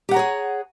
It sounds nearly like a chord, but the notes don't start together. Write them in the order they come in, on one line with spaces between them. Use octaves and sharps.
G4 F#5 A#5 C#5 G#4